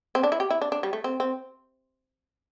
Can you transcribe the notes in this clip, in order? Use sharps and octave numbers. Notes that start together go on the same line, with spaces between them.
C4
D4
E4
G4
E4
D4
D4
G3
A3
C4
C4